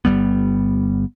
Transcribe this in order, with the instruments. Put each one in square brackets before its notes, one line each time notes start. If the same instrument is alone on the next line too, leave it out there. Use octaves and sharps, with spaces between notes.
[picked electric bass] G1 G#2 G3 B3